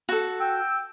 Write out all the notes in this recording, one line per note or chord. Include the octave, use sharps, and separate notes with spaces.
F#4 A4
G5 E6